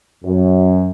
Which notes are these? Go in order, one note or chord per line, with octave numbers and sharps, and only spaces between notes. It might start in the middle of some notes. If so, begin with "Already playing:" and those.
F#2